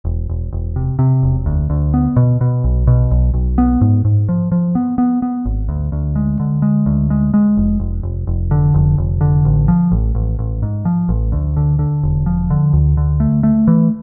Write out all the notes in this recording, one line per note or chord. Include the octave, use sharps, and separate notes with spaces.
E1
E1
E1
C3
C3
E1
D2
D2
B3
B2
B2
B1
B2
B1
B1
B3
G#2
G#2
F3
F3
B3
B3
B3
G#1
D2
D2
G#3
D3
G#3
D2
G#3
G#3
F1
F1
F1
F1
D3
F1
F1
D3
A1
F3
A1
A1
A1
G#2
F3
A1
D2
D3
D3
E1
F3
D3
D2
D3
A3
A3
E3